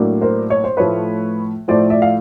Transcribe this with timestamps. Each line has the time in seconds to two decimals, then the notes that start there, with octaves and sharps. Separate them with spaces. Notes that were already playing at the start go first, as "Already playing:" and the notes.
Already playing: A2 F#3 A#3 D4
0.21 A#4 C5
0.50 C#5
0.64 C5
0.77 A2 F3 A3 B4 C#5
1.68 A2 F3 A3 C5 D5
1.90 D5 E5
2.02 F5